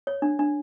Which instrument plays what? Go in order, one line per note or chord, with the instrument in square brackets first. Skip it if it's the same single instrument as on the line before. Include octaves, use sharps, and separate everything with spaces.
[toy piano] C#5
D4
D4